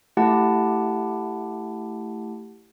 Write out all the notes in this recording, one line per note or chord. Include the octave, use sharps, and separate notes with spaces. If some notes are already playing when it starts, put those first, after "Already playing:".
A3 E4 G4 F#5 A5